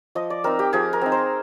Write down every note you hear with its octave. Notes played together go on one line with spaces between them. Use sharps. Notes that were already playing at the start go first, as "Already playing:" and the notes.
F3 D#5
D5
C4 D#4 A#4
G4
F3 G#4
A#4
C4 D#4
C5